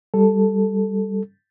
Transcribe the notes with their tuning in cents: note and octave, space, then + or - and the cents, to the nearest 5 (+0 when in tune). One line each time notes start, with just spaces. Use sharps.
G3 +0 A4 +0